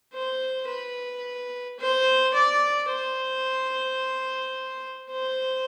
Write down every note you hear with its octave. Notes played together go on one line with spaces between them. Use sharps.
C5
B4
C5
D5
C5
C5